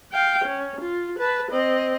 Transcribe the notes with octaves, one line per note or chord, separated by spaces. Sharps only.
F5 G5
C#4
F4
B4 A5
C4 D#5